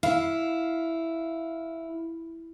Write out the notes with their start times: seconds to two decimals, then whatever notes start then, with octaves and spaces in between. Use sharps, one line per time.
0.03 E4 F5